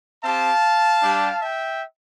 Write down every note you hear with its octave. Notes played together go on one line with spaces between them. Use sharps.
C4 G4 F5 A5
G3 D4 G4
E5 G5